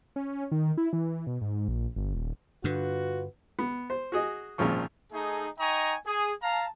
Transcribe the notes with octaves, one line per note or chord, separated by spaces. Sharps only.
C#4
D#3
E4
E3
B2
G#2
A#1
G1
D#1
G2 D3 F4 F#4 B4
B3
C5
F#4 G#4 D#5
G#1 A#2 C#3 F3 C#6
A3 D#4 G#4
D#4 D#5 G5 G#5 A#5 C#6
G#4
F5 A5 A#5